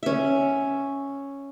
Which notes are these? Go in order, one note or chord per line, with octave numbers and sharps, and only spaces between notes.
C#4 E5